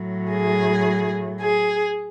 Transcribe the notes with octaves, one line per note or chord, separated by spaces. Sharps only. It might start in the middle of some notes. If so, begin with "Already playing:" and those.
Already playing: A2 F#3
G#4
G#4